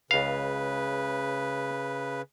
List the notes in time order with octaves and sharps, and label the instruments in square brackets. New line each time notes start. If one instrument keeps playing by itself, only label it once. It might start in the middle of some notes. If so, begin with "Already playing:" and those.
[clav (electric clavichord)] C#2 F5 [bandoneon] C#3 B4